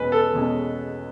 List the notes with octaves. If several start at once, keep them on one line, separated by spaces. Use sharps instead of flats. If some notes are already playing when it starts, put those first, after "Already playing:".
Already playing: E2 B2 G#3 C#4 B4
A4
E2 B2 G#3 C#4